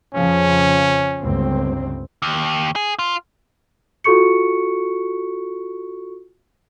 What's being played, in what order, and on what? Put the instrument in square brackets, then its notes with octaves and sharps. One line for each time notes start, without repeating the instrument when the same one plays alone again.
[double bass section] F2 C#3 F3 [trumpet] C#4
[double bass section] G1 C#2 C4
[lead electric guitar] D#2
G#4
F4
[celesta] F4 F#4 A4 C#6 C#7